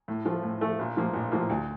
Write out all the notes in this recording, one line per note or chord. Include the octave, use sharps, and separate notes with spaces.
A2
F3 A3
A2
F3 A3
A#1
A2 F3 A#3
A#1
A2 F3 A#3
D2